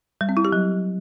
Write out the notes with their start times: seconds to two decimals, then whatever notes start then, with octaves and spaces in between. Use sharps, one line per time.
0.21 G3
0.29 C4
0.37 E4
0.45 G4
0.52 F#3